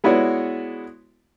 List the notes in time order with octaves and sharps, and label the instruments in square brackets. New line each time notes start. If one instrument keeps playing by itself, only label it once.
[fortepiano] G#3 B3 E4 F#4 C#5 D5